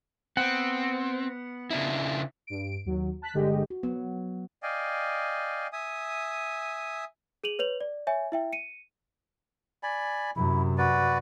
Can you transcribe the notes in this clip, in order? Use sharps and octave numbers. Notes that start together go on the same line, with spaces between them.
B3 C4 F#5
C#3 D4 E4
G2 D7
D#2 F#3
A5 F#6 B6
G1 D3 G#3 G4 D#5
F#4
F#3 B3
D5 D#5 F5 G5 G#5
E5 G#5 D#6
G#4 D#7 F7 F#7
B4 C#5 F7 F#7
D5
C#5 E5 G#5
E4 E5 G5
C#7 D#7
D5 G#5 B5
F#2 C3 E4
F#4 B4 D5